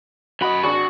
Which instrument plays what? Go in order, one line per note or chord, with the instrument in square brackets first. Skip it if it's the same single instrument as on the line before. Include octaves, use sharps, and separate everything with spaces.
[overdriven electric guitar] F#2 B5 [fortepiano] F#4 D#5
[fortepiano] G#1 D4 [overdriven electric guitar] F#4